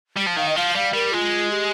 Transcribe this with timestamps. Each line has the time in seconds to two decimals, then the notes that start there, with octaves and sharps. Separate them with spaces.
0.17 G3
0.27 F3
0.37 D#3 F5
0.49 D#5
0.56 F3 F5
0.75 G3 F5
0.94 G3 A#4
1.13 G#3 F4
1.51 G4